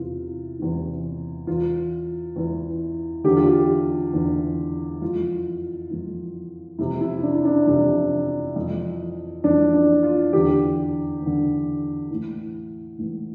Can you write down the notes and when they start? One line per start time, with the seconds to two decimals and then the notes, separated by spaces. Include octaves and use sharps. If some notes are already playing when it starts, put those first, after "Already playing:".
Already playing: E2 C3 E3 F4
0.59 E2 C3 E3
1.47 E2 E3 F4
2.36 E2 E3
3.24 E2 D3 G4
3.36 F4
3.48 G4
4.13 E2 D3
5.02 F2 E3 F4
5.90 F2 E3
6.78 F2 C3 E3 E4
7.01 E4
7.23 D4
7.35 E4
7.45 D4
7.67 F2 C3 E3 D4
8.56 F2 E3
9.44 F2 E3 D4
9.74 D4
10.03 F4
10.33 E2 D3 G4
11.22 E2 D3
12.10 A2 E3
12.99 A2 E3